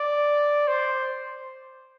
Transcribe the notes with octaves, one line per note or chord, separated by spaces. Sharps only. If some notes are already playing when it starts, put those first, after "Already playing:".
Already playing: D5
C5